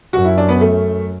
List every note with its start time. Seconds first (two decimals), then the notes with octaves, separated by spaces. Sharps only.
0.13 F#2 F#4
0.25 E4
0.38 D4
0.49 B3
0.61 A3